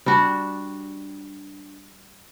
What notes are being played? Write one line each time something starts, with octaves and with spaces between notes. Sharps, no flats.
G3 D4 F#4